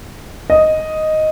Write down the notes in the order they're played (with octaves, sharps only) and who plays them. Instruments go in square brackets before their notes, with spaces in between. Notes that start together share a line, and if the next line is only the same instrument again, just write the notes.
[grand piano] D#5